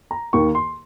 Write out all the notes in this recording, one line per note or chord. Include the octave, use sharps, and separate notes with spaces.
A#5
D#2 D#3 A#3 C#6
C6